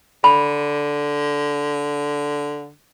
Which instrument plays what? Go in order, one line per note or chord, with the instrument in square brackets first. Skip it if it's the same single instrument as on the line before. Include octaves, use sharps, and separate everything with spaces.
[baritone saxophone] D3 [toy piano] B5